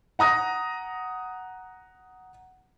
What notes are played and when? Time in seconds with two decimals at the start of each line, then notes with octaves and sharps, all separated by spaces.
0.19 F#5 A#5 D#6 A#6